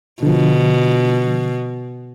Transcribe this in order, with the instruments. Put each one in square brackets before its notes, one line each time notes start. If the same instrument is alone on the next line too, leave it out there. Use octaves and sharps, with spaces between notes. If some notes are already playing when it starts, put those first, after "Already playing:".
[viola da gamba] B2 [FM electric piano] D3 F3